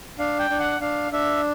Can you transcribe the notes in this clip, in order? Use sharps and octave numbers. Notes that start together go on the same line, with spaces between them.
D4 F5
G5
D4
F#5
D4 F5
D4 E5